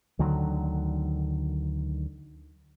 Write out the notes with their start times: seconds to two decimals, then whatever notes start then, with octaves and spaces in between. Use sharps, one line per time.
0.19 D2 D3 D#3 F#3